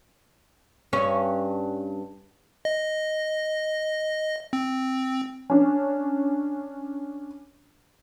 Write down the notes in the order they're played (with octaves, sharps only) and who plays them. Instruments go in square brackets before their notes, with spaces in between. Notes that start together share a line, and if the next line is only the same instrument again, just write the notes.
[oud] G2 C#4
[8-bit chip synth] D#5
C4
[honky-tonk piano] C#4 D4